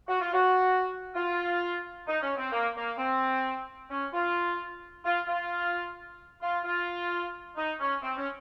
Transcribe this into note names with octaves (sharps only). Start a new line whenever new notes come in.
F#4
F4
F#4
F4
D#4
C#4
C4
A#3
A#3
C4
C#4
F4
F4
F4
F4
F4
D#4
C#4
C4
C#4